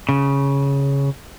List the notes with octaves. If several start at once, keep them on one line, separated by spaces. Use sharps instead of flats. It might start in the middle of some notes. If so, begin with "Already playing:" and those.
C#3